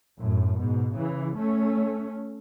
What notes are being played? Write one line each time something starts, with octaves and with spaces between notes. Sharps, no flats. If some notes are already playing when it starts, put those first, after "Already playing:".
F#2 A2
G#2 B2
C#3 E3
A3 C#4